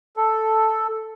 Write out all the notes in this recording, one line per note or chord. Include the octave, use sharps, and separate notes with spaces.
A4